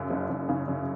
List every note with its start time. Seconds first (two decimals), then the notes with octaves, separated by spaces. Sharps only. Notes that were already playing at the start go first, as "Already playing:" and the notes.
Already playing: F#2 C#3
0.10 F#1
0.29 F#1
0.49 C#3
0.68 F#2